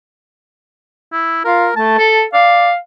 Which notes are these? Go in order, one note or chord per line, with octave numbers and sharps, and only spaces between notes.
E4
F4 A#4
A3 A5
A4
D5 F5